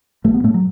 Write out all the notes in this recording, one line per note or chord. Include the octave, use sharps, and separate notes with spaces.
A1 A3
B3
A2 A3
F#3